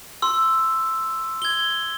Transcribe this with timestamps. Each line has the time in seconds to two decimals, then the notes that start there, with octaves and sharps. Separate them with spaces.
0.22 C6 E6
1.42 G#6 G7